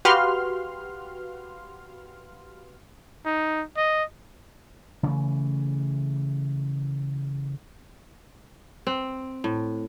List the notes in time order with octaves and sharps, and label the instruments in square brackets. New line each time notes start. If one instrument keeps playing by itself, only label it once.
[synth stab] F#4 G4 B4 F5 C6 F6
[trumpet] D#4
D#5
[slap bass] C#3 E3 A3
[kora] C4
A2